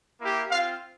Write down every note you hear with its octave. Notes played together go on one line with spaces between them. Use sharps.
A#3 E4 G4
C4 F4 F5